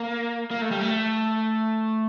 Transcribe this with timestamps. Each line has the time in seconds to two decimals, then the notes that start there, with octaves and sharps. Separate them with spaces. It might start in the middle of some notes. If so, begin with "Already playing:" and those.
Already playing: A#3
0.51 A#3
0.61 A3
0.71 G3
0.81 A3